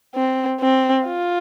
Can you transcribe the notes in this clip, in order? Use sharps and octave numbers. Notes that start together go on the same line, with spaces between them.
C4
C4
F4